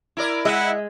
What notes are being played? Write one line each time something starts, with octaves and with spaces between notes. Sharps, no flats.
E4 A#4 D5
G#3 E4 D#5 E5 F#5